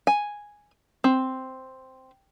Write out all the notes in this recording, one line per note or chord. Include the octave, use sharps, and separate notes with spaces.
G#5
C4